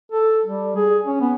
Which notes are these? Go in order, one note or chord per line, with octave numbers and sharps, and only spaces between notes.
A4
G3
G#4
C#4
B3